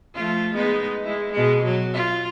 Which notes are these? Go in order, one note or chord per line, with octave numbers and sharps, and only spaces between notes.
F3 A3 F4
G#3 B3 D#4
G#3 E4
B2 G#3
F#3
F4